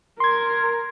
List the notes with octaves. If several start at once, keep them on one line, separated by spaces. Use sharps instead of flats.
A#4 C6 G#6